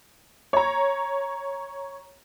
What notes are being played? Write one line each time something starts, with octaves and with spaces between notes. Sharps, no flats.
C#5 A#5